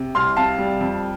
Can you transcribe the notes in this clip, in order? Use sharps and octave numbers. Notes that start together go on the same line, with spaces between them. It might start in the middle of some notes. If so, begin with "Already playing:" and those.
Already playing: C3
C2 C6 F6
C3 F5 A5
G3
F2